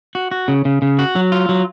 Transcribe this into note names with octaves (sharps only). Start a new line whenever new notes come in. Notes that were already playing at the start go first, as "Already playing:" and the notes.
F#4
F#4
C#3
C#3
C#3
F#4
F#3
F4
F#3